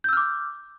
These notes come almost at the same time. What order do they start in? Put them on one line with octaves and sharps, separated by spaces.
G6 E6 F6 D6